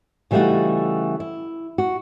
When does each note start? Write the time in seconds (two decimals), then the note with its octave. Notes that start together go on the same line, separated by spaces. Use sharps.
0.31 C#3 E3 G3 A3 D#4 F#4
1.20 E4
1.78 F#4